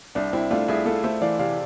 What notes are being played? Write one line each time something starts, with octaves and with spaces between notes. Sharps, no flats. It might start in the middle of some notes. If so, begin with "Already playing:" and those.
C2 D4
C2 C4 E4
A3 D4 F4
C2 E4 G#4
A3 F4 A4
A3 C5 E5
E3 D5 F5
C3 D5 F5